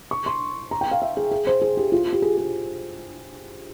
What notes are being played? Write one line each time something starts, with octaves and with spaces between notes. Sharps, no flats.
C#6
C6
A#5
G5
F5
E5
G#4
G#4
C5
G#4
G4
F4
G4
G#4
G#4